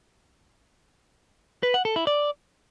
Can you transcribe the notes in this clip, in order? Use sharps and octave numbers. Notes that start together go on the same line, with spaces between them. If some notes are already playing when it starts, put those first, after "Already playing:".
B4
F#5
A4
E4
D5